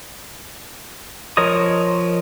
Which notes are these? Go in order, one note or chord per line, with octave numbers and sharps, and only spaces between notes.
F3 A#4 C#5 D#5 D#6